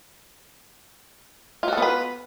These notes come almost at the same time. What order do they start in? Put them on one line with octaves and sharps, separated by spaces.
F4 F#4 A4 B3 B4